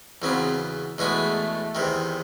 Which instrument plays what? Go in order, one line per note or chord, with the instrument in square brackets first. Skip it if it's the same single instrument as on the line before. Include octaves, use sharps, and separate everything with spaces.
[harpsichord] E2 C#3 F#3 B3 [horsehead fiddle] C4
[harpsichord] E2 B2 G#3 B3 [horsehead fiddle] A3
[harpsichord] E2 C3 D#3